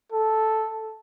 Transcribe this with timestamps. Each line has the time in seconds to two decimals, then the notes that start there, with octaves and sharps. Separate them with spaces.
0.12 A4